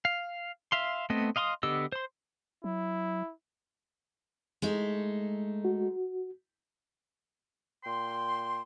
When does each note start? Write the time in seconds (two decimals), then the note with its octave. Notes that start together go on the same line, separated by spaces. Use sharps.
0.05 F5
0.72 E5 F5 C6
1.10 A3 B3 C4 D#5
1.36 D#5 F5 C6 C#6 D#6
1.63 D3 B3 G4 D#5 E6
1.92 C5 C6
2.64 F#3 E4
4.62 G#3 A3 D#4
5.65 F#4
7.84 A#2 G5 C6